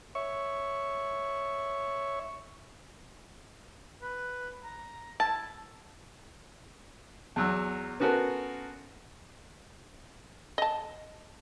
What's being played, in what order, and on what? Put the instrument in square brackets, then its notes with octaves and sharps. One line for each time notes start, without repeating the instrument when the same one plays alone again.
[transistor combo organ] C#5 E5 C#6
[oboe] B4
A#5
[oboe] E4 [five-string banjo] A5
[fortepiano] E2 F#3 E6
B3 C#4 F#4 A4 A#4 C5
[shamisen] D#5 A5